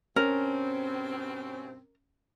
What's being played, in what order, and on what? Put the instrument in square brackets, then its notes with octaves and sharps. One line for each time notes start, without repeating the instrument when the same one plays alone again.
[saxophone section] G2 B2 C4 [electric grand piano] C#4 [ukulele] A#4